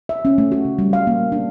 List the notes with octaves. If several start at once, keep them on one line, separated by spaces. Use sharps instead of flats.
E5
C#4
A3
F#4
C#3
G3
F5
A#3
D4